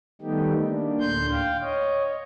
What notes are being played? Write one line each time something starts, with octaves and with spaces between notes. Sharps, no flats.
D#3 G3 A3 B3 D#4 G4
A#3 D4
D2 A2 D3 C6 G6
F5 G5
C#5 D#5